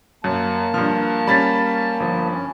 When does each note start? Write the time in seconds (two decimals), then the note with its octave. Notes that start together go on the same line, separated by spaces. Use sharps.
0.24 F#2 A#3 A5
0.74 G2 F3 F6
1.27 G3 C#4 C#5 B5 A6 B6
2.00 G1 F3
2.31 C#4